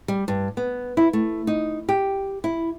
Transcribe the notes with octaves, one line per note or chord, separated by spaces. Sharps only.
G3
G2
B3
E4
A3
D#4
G4
E4